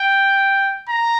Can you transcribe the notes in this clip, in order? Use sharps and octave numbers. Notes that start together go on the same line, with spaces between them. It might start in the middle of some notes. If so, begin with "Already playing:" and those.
Already playing: G5
A#5